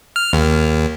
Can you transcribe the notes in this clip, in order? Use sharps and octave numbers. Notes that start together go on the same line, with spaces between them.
F6
D#2